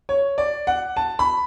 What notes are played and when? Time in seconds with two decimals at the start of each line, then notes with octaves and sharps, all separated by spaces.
0.09 C#5
0.38 D5
0.67 F#5
0.97 A5
1.19 B5